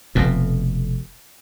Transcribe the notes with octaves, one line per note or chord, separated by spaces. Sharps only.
F1 F2 B2